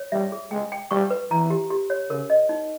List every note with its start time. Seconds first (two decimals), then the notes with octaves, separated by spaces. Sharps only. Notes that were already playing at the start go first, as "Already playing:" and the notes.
Already playing: C#5
0.12 G3 E5
0.32 G#4
0.51 G#3 G5
0.72 G5
0.91 G3 C#6
1.11 B4
1.31 E3 A#5
1.50 G4
1.70 G4
1.90 C#5
2.10 C#3 A#4
2.30 D#5
2.49 D#4